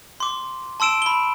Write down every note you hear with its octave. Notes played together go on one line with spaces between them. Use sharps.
C6 D6
A5 C6 E6 D7 E7
B5 G7